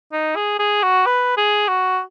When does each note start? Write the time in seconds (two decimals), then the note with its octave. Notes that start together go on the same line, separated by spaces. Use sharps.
0.13 D#4
0.36 G#4
0.59 G#4
0.83 F#4
1.06 B4
1.37 G#4
1.68 F#4